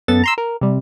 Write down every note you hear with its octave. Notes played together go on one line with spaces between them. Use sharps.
F#2 B3 A4 A6
A#5 C6 E6
A#4
C3 G3